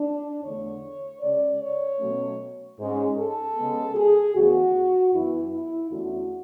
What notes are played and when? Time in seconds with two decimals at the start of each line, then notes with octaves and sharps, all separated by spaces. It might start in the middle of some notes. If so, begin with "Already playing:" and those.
Already playing: D4
0.43 E2 D3 A3 C#5
1.21 C#3 G#3 C#4 D5
1.60 C#5
2.00 B2 F#3 A3 C#4
2.78 G#2 G#3 C#4
3.17 A4
3.56 C#3 G#3 B3
3.95 G#4
4.34 D2 C#3 E3 B3 F#4
5.13 F#2 E3 B3 E4
5.52 E4
5.91 E2 D3 A3 C#4 F#4